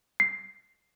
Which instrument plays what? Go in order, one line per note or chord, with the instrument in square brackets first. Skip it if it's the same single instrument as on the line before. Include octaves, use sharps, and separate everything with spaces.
[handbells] C7